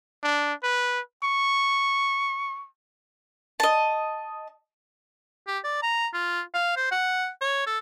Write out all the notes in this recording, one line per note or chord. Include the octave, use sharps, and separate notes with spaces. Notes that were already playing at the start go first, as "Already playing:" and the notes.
D4
B4
C#6
D#5 A5
G4
D5
A#5
F4
F5
C5
F#5
C#5
A4